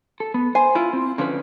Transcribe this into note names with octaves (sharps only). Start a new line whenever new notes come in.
A4
B3
C5 G#5
E4 F4
C4
D3 F3 C#4 B4